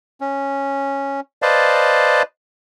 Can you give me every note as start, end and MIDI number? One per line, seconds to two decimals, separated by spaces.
0.21 1.20 61
1.42 2.22 71
1.42 2.22 72
1.42 2.22 74
1.42 2.22 75
1.42 2.22 77
1.42 2.22 81